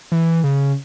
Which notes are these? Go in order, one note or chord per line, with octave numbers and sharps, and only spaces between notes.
E3
C#3